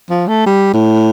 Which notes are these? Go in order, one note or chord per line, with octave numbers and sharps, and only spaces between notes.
F3
A3
G3
A2